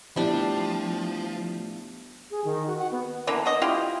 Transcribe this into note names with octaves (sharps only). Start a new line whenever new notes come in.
F3 G3 A3 B3 D4 E4
G#4
D#3
F#4
F#5
B3
D3 E3 A#3
F#4 D#5
E4 F4 G4